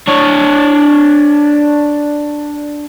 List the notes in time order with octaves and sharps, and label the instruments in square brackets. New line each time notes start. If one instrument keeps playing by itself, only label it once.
[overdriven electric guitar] D4 C#5